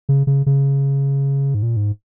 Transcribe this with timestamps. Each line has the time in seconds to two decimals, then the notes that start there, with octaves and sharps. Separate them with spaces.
0.09 C#3
0.27 C#3
0.46 C#3
1.54 G#2
1.63 A#2
1.76 G#2